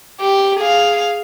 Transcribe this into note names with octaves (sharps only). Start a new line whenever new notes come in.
G4
G#4 F5